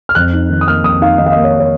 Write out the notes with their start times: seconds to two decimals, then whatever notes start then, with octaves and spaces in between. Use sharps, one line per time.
0.09 F6
0.15 F2 F#6
0.33 D#4
0.50 D#3
0.61 D#6
0.67 A#3 F6
0.84 F2 D#6
1.01 D#4 F5
1.18 D#3 D#5
1.26 F5
1.32 D#5
1.36 A#3
1.44 C#5
1.60 C#5